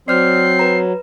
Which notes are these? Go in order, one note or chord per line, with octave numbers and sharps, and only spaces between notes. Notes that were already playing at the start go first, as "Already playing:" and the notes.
F#3 C4 D5 F6 C7
B4 A#5